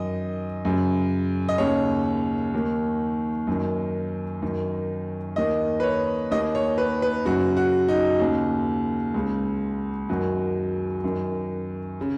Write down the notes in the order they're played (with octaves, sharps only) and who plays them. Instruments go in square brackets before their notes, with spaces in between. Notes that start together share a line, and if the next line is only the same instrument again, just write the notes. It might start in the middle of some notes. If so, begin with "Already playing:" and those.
Already playing: [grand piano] F#2 D#3 D#5
F#2 C#3
D#5
D#2 C#3 C#5
D#2 D#3
F#2 D#3
F#2 D#3
D#2 D#3 D#5
B4
C#5
D#2 D#3 D#5
C#5
B4
B4
F#2 C#3 F#4
F#4
D#4
D#2 C#3
C#2 C#3
F#2 D#3 F#4
F#2 D#3
C#3